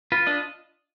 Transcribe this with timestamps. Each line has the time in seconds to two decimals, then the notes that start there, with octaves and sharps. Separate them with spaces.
0.12 F4 B4
0.27 D4 D#5